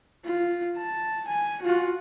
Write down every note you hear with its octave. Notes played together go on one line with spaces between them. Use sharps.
F4
A5
G#5
F4 F#4